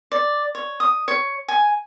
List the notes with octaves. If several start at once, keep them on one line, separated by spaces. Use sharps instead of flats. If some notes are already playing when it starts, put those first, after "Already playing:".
D5
C#5
D#6
C#5
G#5